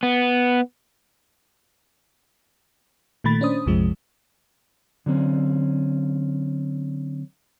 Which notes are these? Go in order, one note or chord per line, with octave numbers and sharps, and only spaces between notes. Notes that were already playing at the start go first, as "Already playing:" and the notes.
B3
A#2 D#3 A3 B5 A6
C#4 D4 C5 D#6
A#1 F2 C3 F3 G#3
D3 F#3 C4 C#4